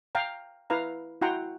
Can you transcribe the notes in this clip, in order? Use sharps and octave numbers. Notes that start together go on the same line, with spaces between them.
F5 G5 A#5
E4 B4 F5 A#5
E4 F#4 F#5 G5 A#5 C6